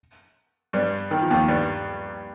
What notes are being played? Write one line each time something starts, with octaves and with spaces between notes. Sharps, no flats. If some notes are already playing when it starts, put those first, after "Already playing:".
G2 G3
D#3
F3
D#2 D#3
G2 G3